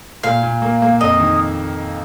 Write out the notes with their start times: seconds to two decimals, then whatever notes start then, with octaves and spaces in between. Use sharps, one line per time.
0.23 A#2 F5
0.43 A#2
0.62 A#3
0.82 A#3
1.01 F2 D#5
1.20 D#3